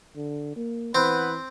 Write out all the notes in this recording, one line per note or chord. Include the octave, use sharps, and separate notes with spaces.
D3
A#3
E3 B3 C4 B4